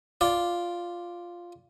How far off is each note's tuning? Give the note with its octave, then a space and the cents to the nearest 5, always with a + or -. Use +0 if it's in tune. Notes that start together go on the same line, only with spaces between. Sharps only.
F4 +0 D5 +0